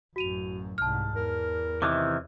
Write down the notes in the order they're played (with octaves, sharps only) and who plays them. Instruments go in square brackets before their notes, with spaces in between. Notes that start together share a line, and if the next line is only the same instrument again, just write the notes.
[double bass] A1 F#2 [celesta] F#4 D#7 F7
[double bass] C2 G#2 [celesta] A5 F6
[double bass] E2 [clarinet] A#4
[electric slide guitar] C3 D#3 E3 [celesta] D6